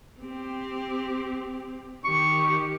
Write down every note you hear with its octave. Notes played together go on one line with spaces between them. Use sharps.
C4 G4
D#3 G4 C#6